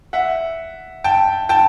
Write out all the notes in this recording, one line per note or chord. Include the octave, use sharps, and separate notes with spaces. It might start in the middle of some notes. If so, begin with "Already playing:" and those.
E5 F#5
G5 A5
G5 A5